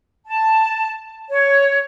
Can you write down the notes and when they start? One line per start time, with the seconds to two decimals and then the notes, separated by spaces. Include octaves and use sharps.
0.26 A5
1.31 C#5